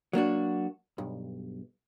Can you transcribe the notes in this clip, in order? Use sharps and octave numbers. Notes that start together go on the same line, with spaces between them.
F#3 A#3 D4 F#4
B1 G2